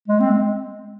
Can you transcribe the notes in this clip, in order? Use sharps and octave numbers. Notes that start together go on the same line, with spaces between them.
G#3
C4
G#3